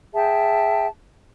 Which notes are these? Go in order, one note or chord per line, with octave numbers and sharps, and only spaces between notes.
G#4 E5 G5 A5